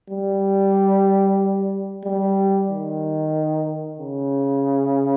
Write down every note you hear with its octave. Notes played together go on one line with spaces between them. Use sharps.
G3
G3
D#3
C#3